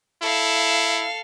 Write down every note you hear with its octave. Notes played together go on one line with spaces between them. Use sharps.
E4 A4 F5